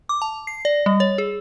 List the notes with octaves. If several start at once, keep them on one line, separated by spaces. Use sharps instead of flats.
D6
A5
C7
D5
G3
C#5
G#4